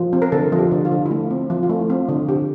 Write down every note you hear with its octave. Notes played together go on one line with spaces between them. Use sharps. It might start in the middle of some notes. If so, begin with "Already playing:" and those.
Already playing: F3
C4
A#4
D3 A4
F3
G4
D3
F4
D3
E4
A3 F4
C4
F3
F4
A3
E4
C4 F4
D3
D3 G4